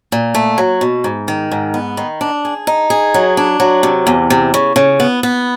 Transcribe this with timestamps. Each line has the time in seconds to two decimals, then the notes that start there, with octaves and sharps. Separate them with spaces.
0.12 A#2
0.35 A3
0.58 F#3
0.81 B2
1.04 G#2
1.28 D#3
1.52 G#2
1.74 B3
1.97 D#3
2.21 D4
2.45 G#4
2.67 D#4
2.90 G#4
3.14 F#3
3.37 D4
3.60 F#3
3.83 C3
4.07 E2
4.30 C3
4.54 C#3
4.76 C#3
5.00 B3
5.23 B3